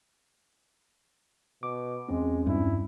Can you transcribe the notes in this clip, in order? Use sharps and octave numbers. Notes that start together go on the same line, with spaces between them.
B2 D6
E2 G#3 C4 C#4
G2 E4